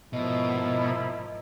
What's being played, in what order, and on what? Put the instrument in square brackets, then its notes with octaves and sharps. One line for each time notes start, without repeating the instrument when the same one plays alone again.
[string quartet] G#2 F3 A#3 [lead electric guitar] B2 [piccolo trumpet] E4 [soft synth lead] D#5